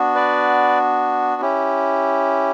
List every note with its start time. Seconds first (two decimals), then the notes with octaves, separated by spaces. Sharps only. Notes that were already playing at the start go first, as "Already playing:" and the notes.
Already playing: B3 D4 F#4
0.15 B4 D5
1.41 C#4 E4 G4